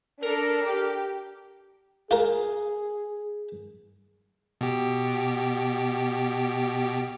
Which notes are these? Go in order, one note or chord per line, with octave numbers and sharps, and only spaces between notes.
D4 A4 A#4
G4
F4 G#4 A#4
B2 G4